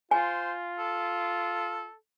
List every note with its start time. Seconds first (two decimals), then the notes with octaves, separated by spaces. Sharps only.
0.11 F4 C5 G#5
0.79 A4